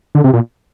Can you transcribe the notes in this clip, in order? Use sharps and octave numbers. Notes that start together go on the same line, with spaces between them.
D3
C3
A#2